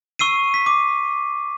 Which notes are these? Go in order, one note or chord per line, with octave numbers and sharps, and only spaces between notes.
C#6 E6 C7 D#7
B6
D6